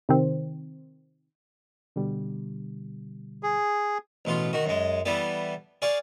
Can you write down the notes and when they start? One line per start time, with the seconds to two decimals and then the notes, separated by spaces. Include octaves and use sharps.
0.09 C3 D#3 C4
1.96 B2 D3 G3
3.43 G#4
4.25 A1 B2 F4
4.53 D#3 F#4
4.66 F#2 G#3
5.05 E3 G3 B3 A4
5.82 G#4 D5 F5 C#6